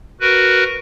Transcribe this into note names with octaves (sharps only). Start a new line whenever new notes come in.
F#4 A#4 B4